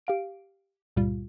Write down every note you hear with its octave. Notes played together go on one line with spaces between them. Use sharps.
G4 F5 D7
C#2 G2 A#2 G3 F4